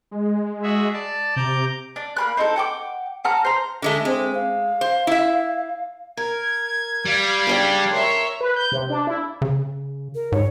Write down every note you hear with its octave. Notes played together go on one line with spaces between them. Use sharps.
G#3
F#4 G#4 E5
D5 A5
C3 A#5 D6 G6
D4
A#3 B5 F#6
C4 D#4 E4 A4
F#5 G5 D6
F#5 A5 A#5 F6
C5 A#5
D3 G#3 A3
G#3 C4
F5
C5
E4 E5
A#4 G#6
G3 D5 F5
C#3 D4 G4
A#4 C#5 E5 C6
B4
G6
C3
D4
E4
C#3
A#4
G#2 C#5